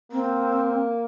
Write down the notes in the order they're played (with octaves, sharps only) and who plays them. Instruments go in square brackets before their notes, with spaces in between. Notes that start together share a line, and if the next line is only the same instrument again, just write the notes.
[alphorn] A#3 [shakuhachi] C4